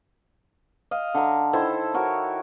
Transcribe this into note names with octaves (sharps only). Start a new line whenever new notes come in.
D#5 F5
D3 A#5
D#3 E4 A4 C5
F#4 A#4 C#5